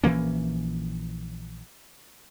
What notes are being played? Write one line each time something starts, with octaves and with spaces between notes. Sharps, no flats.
A#1 E3 A#3 C#4